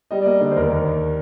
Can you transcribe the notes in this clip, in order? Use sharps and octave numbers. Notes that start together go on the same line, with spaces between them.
G3 D#5
D5
A#3 D#5
D3 D5
C5
D#2 A#4
D#2
D#2